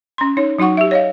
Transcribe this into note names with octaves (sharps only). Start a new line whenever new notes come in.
C#4 C6
D#4 C#5
F#3 D#4 F#4 F#5 C#6
G4 E5
C#5 D#5 F5